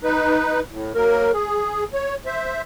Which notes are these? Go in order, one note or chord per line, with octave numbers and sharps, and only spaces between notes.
D#4 B4
A2
F#3 A#3 A#4
G#4
C#5
C5 E5